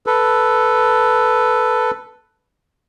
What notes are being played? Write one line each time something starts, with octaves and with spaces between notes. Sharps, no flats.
A4 B4